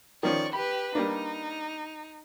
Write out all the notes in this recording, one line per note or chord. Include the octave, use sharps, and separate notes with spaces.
D#3 F3 C#4 D5 C#6
G4 B4 B5
G3 A#3 D4 D#4